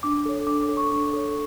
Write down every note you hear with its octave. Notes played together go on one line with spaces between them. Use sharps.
D4 D6
A4 C#5
D4 D6
D6
A4 C#5
C#6
D4
A4 C#5